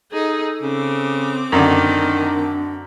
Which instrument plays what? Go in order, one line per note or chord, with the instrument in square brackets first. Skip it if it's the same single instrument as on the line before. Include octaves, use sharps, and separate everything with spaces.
[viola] D#4 G#4 [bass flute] A4
[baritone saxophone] C#3 [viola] C4 D6
[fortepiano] F#2 D3 [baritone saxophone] D#3 [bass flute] D4